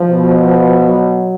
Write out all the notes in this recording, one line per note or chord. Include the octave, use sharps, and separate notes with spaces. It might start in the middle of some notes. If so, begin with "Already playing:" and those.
Already playing: F3
B2
F#3